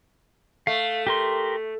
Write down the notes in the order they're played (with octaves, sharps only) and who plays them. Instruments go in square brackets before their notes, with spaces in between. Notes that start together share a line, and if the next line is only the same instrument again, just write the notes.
[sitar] A3 [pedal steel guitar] F5
[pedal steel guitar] G4 A#4 C6